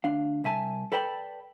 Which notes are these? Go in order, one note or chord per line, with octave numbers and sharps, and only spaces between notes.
D2 D4 F5
C2 E5 G#5 A5
A4 B4 D5 G5 A5 B5